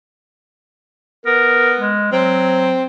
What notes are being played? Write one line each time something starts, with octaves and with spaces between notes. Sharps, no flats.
B3 A#4
G#3
F#3 C4